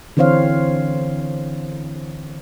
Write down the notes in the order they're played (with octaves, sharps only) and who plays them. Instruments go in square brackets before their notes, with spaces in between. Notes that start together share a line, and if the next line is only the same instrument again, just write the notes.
[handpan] D3 E3 C4 C5 C#5 F5